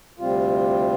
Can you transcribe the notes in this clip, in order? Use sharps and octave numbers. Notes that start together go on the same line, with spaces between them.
D2 C3 G3 C4 F4